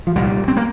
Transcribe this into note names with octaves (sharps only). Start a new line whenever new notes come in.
F3
C2 A#2 G3
C4
A#3